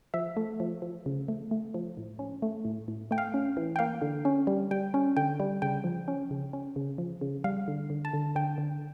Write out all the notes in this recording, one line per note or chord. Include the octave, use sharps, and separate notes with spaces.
F3 E5
A3
F3
F3
C#3
A3
A3
F3
A2
C#4
A3
A2
A2
A3 G5
F5
C#4
E3
G5
A#3 F5
D3
C#4
G3
G3 G5
C#4
D3 G5
G3
C#3 G5
F3
C#4
C#3
C#4
C#3
F3
C#3
G3 F5
D3
D3
A5
D3
D3 G5
D3